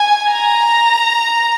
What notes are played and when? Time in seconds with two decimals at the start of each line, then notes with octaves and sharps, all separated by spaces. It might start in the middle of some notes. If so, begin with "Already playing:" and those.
Already playing: G#5
0.31 A#5